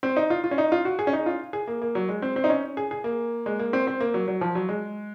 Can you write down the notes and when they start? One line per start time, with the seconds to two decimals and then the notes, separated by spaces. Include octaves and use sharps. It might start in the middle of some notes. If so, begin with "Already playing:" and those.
0.03 C4
0.17 D#4
0.30 F4
0.44 F4
0.51 C#4
0.58 D#4
0.72 F4
0.85 F#4
0.99 G#4
1.07 C#4
1.13 D#4
1.26 F4
1.53 G#4
1.67 A#3
1.82 A#3
1.95 F#3
2.09 G#3
2.22 C4
2.36 C4
2.44 D#4
2.49 C#4
2.77 G#4
2.91 G#4
3.04 A#3
3.46 G#3
3.59 A#3
3.73 C4
3.87 C4
4.00 A#3
4.14 F#3
4.28 F#3
4.41 F3
4.55 F#3
4.69 G#3